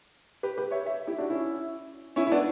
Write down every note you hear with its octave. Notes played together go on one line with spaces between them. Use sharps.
G4 B4
G4 B4
C#5 E5
C#5 E5
E4 G4
D4 F#4
C#4 E4
C#4 E4
E4
B3 D4